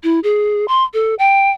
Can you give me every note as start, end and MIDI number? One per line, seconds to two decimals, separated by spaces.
0.03 0.20 64
0.24 0.66 68
0.68 0.84 84
0.94 1.15 69
1.19 1.51 79